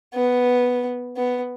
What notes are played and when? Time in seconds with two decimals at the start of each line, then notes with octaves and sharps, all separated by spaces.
0.15 B3
1.16 B3